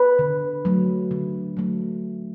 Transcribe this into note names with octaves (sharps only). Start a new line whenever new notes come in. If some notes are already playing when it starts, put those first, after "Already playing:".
Already playing: B4
D3
F#3 A3
D3
F#3 A3